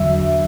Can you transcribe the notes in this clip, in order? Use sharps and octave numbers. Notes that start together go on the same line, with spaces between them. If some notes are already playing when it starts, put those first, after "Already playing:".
Already playing: E2 D3 F#3 E5